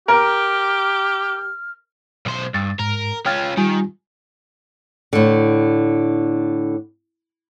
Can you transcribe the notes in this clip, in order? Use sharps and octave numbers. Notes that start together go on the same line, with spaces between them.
G4 A#4 F6
B1 C5
G2 A6
G#2 A#4
C#4 F4 G5 F6 A6
D#3 G3 F4 G#5
A2 D3